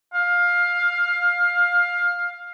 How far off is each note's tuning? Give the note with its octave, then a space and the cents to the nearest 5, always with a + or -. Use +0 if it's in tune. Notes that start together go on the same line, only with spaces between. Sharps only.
F5 +15